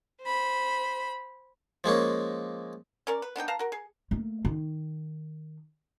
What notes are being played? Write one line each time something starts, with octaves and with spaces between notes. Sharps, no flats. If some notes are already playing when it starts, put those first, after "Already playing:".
C5 B5
F3 G#3 A#3 C#4
C#4 A#4 D5
B4
B3 D4 D#4 G5
B4 F5 A5 A#5
F#4 A#4
G#4
A3 A#3
D#3